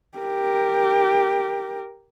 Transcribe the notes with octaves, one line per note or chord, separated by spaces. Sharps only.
G4 A#4